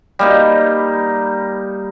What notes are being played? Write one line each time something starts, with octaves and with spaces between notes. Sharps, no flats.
G3 A#3 D#4